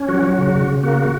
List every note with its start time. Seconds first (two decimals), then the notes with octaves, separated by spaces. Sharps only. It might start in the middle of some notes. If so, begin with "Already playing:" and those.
Already playing: C#4
0.08 F#3 F#4
0.23 F#3 F#4
0.38 C#3 F#4
0.53 C#3
0.68 C#3
0.83 A#3 F#4